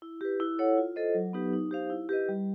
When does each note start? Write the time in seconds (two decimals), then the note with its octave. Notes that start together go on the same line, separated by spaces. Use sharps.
0.02 E4
0.21 G4 B4
0.40 E4
0.58 A4 C#5 F#5
0.77 F4
0.96 A4 C5 D#5
1.14 F#3
1.33 B3 D#4 G4 B4
1.53 D#4
1.71 G4 C5 F5
1.90 E4
2.09 G4 B4 D#5
2.29 G3